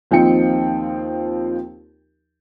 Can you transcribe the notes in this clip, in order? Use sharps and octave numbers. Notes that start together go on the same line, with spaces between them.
D#2 F3 C4 D#4 G5 C#7